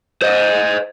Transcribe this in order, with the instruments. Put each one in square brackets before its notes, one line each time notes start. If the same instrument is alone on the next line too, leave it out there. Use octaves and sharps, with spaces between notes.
[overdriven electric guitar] C5 D#5